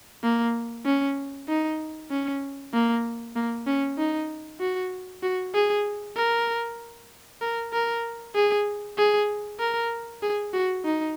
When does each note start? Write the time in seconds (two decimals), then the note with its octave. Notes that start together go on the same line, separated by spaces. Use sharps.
0.23 A#3
0.86 C#4
1.48 D#4
2.10 C#4
2.73 A#3
3.36 A#3
3.67 C#4
3.98 D#4
4.60 F#4
5.23 F#4
5.54 G#4
6.16 A#4
7.41 A#4
7.73 A#4
8.35 G#4
8.98 G#4
9.60 A#4
10.23 G#4
10.53 F#4
10.85 D#4